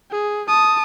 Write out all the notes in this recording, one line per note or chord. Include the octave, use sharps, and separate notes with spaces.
G#4
A5 D#6